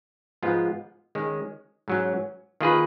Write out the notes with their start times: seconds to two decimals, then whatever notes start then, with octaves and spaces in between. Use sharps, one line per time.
0.43 G#2 F3 G#3 B3 F4
1.15 D#3 G#3 C#4
1.88 G#2 F#3 C#4
2.61 D#3 A#3 F4 G#4 B4